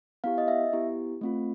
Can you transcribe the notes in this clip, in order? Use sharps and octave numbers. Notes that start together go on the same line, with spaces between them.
B3 E4 G4 F5
D#5
E5
B3 E4 G4
A3 C4 F4